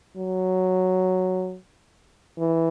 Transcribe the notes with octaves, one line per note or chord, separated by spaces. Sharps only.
F#3
E3